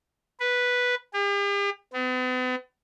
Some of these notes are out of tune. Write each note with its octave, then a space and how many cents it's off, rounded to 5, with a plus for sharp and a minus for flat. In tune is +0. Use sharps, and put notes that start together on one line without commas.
B4 -5
G4 +45
B3 +45